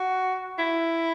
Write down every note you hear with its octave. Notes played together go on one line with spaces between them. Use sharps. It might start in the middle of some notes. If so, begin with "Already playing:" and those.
Already playing: F#4
E4